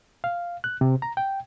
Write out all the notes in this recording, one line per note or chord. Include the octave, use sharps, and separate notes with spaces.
F5
F#6
C3
A#5
G5